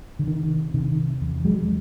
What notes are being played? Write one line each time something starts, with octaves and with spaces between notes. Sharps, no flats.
D3
C3 D#3
C3 D#3
E2
F#3 G#3